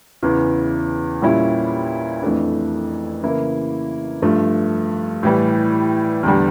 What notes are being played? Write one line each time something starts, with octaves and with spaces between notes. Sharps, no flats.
E2 C#3 E3
A#2 G3 C#4 E4
F2 E3 A3 D4
C#3 E3 A#3 E4
G2 F3 A3 D4
A2 E3 G3
E2 D3 G3